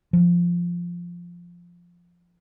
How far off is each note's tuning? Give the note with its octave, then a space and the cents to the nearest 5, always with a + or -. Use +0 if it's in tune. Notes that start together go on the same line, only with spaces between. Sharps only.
F3 -5